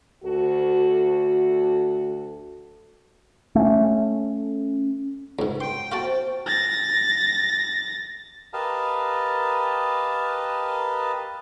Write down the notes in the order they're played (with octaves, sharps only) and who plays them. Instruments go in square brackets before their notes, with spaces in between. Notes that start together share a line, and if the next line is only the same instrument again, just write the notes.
[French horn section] D2 F#4 A4
[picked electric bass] A3 C#4
[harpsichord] C#2 G#2
[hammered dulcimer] F#3 [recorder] G5 [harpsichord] C6
[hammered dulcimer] C3 C4 G#5 [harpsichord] F4 F#4 A5
[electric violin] A6 A#6
[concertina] G4 A#4 B4 D#5 F5 A5